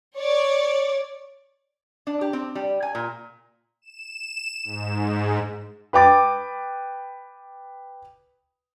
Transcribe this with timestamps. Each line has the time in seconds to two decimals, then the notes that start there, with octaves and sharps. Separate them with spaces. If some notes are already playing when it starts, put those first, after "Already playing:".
0.18 C#5 D5
2.07 D4
2.21 G4
2.33 C4
2.55 G3
2.82 G#5
2.95 A#2
3.82 E7
4.64 G#2
5.93 B4 G5 D6 A6